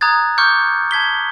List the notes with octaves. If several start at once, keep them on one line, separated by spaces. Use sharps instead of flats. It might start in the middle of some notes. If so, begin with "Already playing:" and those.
A#5 D#6 F#6 G#6 A6
C#6 D6 F6 G6 C#7
A5 G#6 B6 G7